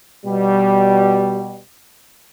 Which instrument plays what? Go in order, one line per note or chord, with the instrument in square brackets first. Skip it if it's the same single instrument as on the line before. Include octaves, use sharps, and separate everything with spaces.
[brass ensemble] B2 G3